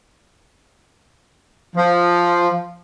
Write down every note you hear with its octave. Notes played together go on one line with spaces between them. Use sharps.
F3